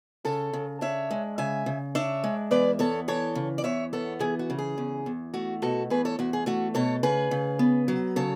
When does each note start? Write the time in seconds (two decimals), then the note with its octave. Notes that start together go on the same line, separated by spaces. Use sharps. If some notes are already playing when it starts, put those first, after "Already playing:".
0.25 C#3 A4 C#5
0.53 C#3
0.81 D4 C#5 E5
1.11 G#3
1.38 C#3 E5 G#5
1.66 C#3
1.95 D4 C#5 E5
2.24 G#3
2.51 E2 B4 D5
2.79 B3 A4 C#5
3.08 E3 A4 C#5
3.35 C#3
3.58 D5
3.64 E2 C#5 E5
3.93 B3 A4 C#5
4.20 E3 G#4
4.39 F#4
4.50 C#3
4.58 G#4
4.78 E2
5.06 E2
5.34 A3 F#4
5.62 B2 F#4 A4
5.90 E2 G#4 B4
6.05 A4 C#5
6.19 E2 F#4
6.33 G#4
6.46 A3 F#4 A4
6.75 B2 A4 C#5
7.03 C#3 G#4 B4
7.31 C#3
7.59 B3
7.88 F#3
8.16 C#3 A4 C#5